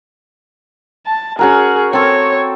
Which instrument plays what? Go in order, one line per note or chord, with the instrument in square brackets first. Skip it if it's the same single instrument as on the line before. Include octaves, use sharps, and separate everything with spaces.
[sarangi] A5
[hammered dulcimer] C#4 F#4 A#4 [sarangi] G#4
[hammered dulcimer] C4 A4 [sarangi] C#5